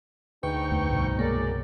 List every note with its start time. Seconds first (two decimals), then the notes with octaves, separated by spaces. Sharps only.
0.43 D2 G#2 D#4 B4 G5 C#6
0.72 E2 A3
0.90 C2 G2 B2
1.19 F#3 G#3 A#3 A#4 D5